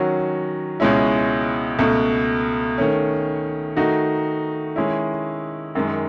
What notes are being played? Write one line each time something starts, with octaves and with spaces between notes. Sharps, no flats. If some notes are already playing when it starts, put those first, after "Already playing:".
Already playing: D#3 F#3 C#4 F#4
C#2 B2 G#3 C#4 E4
C#2 B2 A3
D#3 A3 C#4
D#3 A3 D#4 F#4
D#3 G#3 C#4 E4
F#2 D#3 G#3